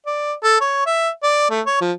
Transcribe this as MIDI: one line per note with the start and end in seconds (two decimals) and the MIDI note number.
0.06 0.33 74
0.43 0.57 69
0.61 0.84 73
0.86 1.09 76
1.23 1.50 74
1.50 1.61 57
1.67 1.79 73
1.81 1.92 53